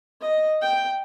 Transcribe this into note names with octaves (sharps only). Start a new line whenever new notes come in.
D#5
G5